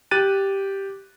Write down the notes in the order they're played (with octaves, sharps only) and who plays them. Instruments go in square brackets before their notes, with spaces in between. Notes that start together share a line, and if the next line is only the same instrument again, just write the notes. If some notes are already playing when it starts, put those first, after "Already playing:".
[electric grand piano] G4 F#6 A6 D#7